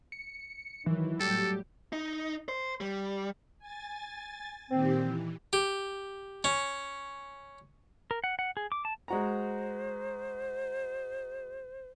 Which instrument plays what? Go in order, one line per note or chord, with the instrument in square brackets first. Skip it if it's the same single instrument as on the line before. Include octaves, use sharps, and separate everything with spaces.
[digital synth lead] C#7
[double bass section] D#3 F#3 [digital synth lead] E3
[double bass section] A2 F#3 G3 [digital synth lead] G4 [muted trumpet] A4
[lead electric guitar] D#4
C5
G3
[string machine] G#5 A6
[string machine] A#2 D#3 G4 [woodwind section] C4
[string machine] E3
[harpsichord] G4
C#4
[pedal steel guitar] A#4
F#5
F#5
G#4
D6
A5
[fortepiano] G#3 F#4 A#5 [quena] C5